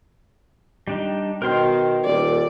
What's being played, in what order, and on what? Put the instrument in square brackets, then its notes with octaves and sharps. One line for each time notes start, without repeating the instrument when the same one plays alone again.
[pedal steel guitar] G3 D4 D#4
[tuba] B2 [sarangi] D#3 [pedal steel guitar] A#4 C5 C6
[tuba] D#1 [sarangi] D5